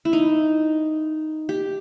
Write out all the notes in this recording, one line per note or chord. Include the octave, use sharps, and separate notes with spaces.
E4
D#4
G4